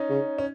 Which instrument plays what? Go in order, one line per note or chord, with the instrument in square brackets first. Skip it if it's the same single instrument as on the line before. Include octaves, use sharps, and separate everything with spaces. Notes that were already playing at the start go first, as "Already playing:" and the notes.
Already playing: [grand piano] C#4 D#4
[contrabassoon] C#3
[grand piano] C#4